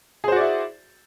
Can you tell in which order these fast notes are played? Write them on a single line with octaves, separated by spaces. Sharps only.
G#4 C5 F#4 D5 E4